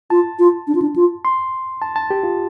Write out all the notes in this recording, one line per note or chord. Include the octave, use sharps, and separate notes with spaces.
F4 A5
F4
D4
F4
D4
F4
C6
A5
A5
G4
F4